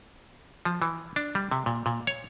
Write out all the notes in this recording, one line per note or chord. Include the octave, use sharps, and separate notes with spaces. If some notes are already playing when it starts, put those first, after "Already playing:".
F3
E3
D4
G3
C3
A#2
A#2
C#5